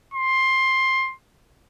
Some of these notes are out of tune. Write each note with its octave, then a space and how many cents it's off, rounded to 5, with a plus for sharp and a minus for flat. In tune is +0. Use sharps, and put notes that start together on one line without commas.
C6 +15